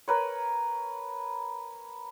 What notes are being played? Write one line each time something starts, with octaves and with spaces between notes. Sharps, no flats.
A#4 B4 C#5